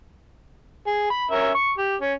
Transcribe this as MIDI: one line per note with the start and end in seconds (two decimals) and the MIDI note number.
0.87 1.08 68
1.10 1.26 83
1.31 1.50 61
1.31 1.50 70
1.31 1.50 76
1.55 1.72 85
1.78 1.96 67
2.01 2.12 61